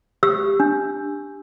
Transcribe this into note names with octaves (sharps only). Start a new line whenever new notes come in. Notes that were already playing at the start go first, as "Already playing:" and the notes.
G4 E6
D4